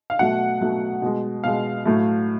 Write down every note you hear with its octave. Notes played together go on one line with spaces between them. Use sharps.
F5
B2 F#3 A3 F#5
B2 F#3 A3
B2 G#3
B2 G#3 F5
A2 F#3 A3